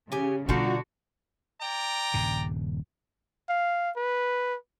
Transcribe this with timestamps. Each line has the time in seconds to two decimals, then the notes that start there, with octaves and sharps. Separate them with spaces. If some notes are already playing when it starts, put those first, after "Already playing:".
0.12 C#3 G4 G#5
0.49 B2 D3 G3 D4 D#4 F4 F#4 A5
1.60 D5 G5 A#5
2.14 D#1 G2 C#3
3.49 F5
3.96 B4